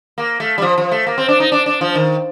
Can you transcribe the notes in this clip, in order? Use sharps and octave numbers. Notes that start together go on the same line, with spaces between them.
A#3
A3
G3
F3
F3
A3
A#3
C4
D4
D#4
D4
D4
F3
D#3